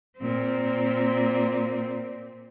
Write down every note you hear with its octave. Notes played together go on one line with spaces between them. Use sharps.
A#2 C4